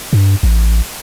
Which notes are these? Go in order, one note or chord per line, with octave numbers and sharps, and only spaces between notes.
G2
A1